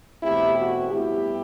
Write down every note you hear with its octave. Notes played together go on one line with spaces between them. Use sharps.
E2 B2 A3 C4 E4 G4
F#4
A2 G3 B3 E4 G4